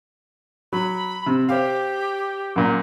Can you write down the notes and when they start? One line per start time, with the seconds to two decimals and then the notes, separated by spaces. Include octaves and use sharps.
0.73 F#3 B5
1.26 C3
1.49 G4 C5 F5
2.56 F#2 A#2